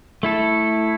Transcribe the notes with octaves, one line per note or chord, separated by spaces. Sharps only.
A3 E4 A4